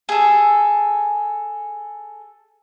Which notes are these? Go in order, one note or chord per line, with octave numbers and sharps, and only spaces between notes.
G#4 A4